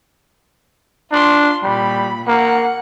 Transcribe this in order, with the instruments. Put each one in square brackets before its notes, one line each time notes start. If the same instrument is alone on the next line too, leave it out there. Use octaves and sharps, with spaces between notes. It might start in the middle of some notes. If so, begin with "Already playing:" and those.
[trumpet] D4 [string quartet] F4 C6
[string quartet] A#2 B5 [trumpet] G3
[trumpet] A#3 [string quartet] F#5